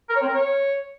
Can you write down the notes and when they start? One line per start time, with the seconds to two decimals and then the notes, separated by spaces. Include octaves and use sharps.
0.10 A#4
0.16 C#5
0.22 C4
0.28 A#4
0.34 C#5